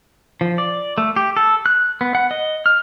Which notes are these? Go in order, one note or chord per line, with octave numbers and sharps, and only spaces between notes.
F3
D5
A3
G4
A4
F#6
B3
F#5
D#5
F6